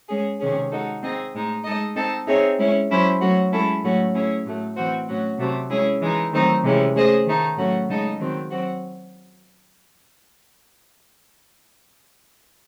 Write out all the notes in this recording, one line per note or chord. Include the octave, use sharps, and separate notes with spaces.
G#3 C#4 G#4
C3 D#3 G#3 C#4 G#4
G#3 D#4 F#4 A4
C4 D#4 G#4 D#5
A2 G#3 D#4
G#3 D#4 A4 D#5
C4 D#4 A4 D#5
C4 D#4 G#4 C#5 E5
G#3 C#4 E4
F#3 C#4 E4 C5
F#3 A3 C#4 F#4
G#3 C#4 E4 A4
A2 F#3 A3 C#4 F#4
A3 C#4 E4 G#4 C#5
A2 F#3 A3
A2 E3 C4 F#4 C5
A2 F#3 C#4 F#4
C3 F#3 A3 C4
G#3 C#4 E4 G#4 C#5
E3 G#3 D#4
D#3 F#3 A3 C4 D#4
C3 E3 G#3 C#4 E4
A3 C#4 G#4 C5 D#5
D#3 A3 D#4
A2 F#3 A3 C#4 F#4
C#3 G#3 D#4 A4 D#5
D#3 F#3 C4
F#3 C4 F#4